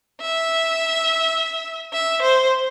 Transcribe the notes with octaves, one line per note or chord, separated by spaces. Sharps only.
E5
E5
C5